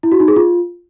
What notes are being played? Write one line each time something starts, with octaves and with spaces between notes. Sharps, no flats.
E4
F#4
D#4
G#4
F4